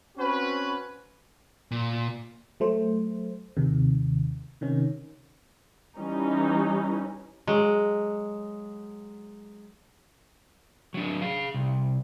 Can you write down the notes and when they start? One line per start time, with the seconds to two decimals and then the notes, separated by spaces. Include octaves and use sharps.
0.17 C4 C#4 F#4 B4
1.71 A#2
2.60 F#3 A3 C5
3.57 D#2 C3 D#3
4.61 C3 D#3 C#4
5.97 E3 G3 C#4 D#4
7.47 F#3 G#3
10.94 F#3 D4
11.22 G#4 F5
11.54 C2